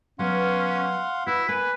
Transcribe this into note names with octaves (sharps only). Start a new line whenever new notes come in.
F#3 B3 C#4 F5 F#5 C6
E4 F#4 B4
A#3 B4 G#5